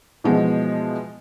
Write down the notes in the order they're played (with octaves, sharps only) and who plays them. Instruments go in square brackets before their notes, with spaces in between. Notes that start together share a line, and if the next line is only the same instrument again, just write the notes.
[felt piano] B2 E3 F3 G#3 B3